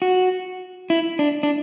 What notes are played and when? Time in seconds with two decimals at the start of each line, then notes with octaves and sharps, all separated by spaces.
0.02 F#4
0.90 E4
1.19 D4
1.43 D4